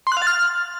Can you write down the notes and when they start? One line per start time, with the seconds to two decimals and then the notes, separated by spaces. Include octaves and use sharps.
0.07 C6
0.12 F#6
0.17 F5
0.22 A6
0.27 F6